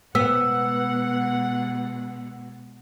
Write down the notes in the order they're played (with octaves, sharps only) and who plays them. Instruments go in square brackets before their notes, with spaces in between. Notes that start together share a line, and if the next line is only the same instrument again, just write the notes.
[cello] B2 G#3 [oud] B3 [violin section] F#5 [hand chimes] E6